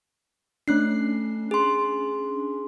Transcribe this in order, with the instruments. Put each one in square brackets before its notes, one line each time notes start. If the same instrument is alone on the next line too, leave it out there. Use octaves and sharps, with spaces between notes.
[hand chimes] A3 F#6 C7 [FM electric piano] C#4 D4
[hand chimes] G#4 C6